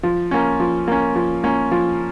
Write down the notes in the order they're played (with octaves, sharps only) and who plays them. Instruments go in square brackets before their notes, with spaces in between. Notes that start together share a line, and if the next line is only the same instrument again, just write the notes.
[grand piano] F3
A#3 C#4
F3
A#3 C#4
F3
A#3 C#4
F3